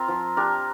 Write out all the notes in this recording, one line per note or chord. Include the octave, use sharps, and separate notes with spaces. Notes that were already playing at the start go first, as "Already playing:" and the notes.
Already playing: C4 F4 A#4
F3
D4 G4 A#4